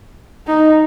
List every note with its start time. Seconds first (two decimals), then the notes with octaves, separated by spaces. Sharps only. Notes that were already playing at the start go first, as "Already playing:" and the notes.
0.47 D#4